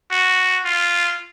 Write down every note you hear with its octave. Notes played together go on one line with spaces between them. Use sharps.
F#4
F4